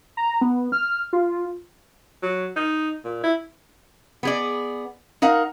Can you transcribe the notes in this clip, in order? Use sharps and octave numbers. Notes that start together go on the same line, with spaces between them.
A#5
B3
F6
F4
F#3
D#4
A#2
E4
B3 G#4 D5
D#4 A#4 F5 F#5